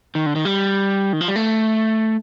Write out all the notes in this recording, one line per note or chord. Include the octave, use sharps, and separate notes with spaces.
D#3
D3
D#3
G3
D#3
F3
G3
A3